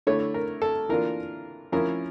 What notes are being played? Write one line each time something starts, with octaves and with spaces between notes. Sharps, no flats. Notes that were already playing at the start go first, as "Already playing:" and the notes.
D3 A3 E4 C#5
A#4
A4
E3 A#3 D4 F4 A#4
F3 C#4 E4 A#4